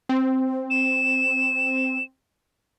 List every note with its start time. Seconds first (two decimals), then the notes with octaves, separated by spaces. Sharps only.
0.09 C4
0.70 E7